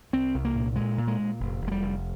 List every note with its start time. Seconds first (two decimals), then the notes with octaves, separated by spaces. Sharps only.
0.13 C2 C4
0.34 C2
0.45 A#3
0.55 A#2
0.76 A#2 G#3
0.98 A#2
1.07 G#3
1.19 A#2
1.40 F1
1.61 F1
1.68 G#3
1.72 G3
1.82 F1